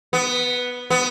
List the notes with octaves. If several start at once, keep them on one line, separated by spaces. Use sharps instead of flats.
B3
B3